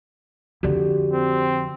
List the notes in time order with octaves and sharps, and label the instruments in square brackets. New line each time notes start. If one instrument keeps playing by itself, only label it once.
[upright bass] F2 D3 [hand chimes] F#4 G4 D5
[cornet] C4